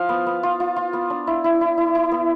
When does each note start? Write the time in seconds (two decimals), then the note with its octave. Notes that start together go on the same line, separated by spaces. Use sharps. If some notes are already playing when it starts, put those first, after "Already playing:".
Already playing: F3 F5
0.09 B3
0.27 B3
0.43 F4
0.60 F4
0.76 F4
0.93 B3
1.10 D4
1.27 E4
1.44 E4
1.61 E4
1.78 E4
1.95 E4
2.12 B3